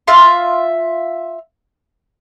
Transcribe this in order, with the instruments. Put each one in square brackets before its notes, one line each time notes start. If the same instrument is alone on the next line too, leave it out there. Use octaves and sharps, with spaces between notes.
[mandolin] F4 E5 F5 C6